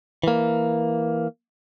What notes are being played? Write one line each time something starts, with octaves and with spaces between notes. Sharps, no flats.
E3 A#3